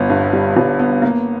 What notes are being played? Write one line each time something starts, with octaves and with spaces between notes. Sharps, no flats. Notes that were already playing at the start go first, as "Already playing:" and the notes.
Already playing: G1 B3
G2
G3
G1
B3
A#3